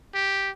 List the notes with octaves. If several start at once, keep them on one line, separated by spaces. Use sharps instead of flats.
G4